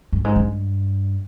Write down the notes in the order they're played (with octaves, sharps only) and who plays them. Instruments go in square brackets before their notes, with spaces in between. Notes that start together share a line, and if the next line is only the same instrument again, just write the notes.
[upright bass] G2
G#2
G2